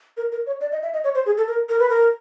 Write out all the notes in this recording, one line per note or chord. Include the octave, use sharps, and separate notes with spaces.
A#4
A#4
C#5
D5
D#5
E5
D#5
C#5
C5
G#4
A4
A#4
A#4
B4
A#4